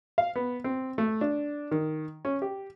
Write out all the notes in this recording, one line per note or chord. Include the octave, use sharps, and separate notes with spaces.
F5
B3
C4
A3
D4
D#3
C#4
G4